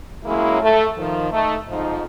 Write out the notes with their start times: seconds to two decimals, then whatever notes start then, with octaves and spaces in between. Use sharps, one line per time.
0.24 F#3 G#3 A#3 C#4 E4
0.62 A3
0.98 D#3 F3
1.32 A3 D#4
1.68 F2 G#2 F3 D#4